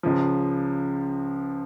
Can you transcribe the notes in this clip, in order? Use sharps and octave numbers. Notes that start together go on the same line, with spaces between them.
C#2 C#3 F3